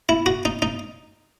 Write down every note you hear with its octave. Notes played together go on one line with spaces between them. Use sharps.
E4
F#4
D#4
D#4